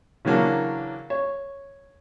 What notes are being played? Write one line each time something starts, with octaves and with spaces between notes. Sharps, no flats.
C#3 E3 F#3 A#3 D4
C#5